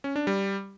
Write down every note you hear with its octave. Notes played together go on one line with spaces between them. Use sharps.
C#4
D4
G3